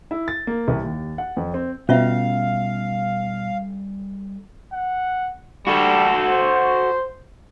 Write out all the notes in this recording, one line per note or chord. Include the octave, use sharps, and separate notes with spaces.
E4
A6
A#3
C2
D#2
F#5
F2
C4
B2 G3 C#4 F4 A4 E5 F5 A#5
F#5
G3 F#4 A4
C5